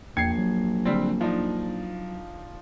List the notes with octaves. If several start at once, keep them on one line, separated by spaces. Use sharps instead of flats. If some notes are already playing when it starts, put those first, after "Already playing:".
A#1 E2 G5 G#6 C7 C#7
F#3
D3 G3 C4
F3 D4 D#4